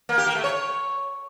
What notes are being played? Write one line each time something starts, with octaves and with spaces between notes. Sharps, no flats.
A#3
G4
A#3
A3
C#5